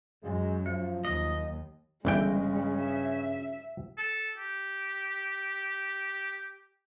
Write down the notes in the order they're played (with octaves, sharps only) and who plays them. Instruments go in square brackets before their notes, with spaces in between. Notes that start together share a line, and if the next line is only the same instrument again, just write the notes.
[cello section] F#2 [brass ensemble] G#3
[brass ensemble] F3 [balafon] F#3
[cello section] D#2 [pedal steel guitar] D#5
[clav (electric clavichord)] G1 E3 G5 [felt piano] G2 [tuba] C#3 [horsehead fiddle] G#3
[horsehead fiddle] E5
[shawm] A4
G4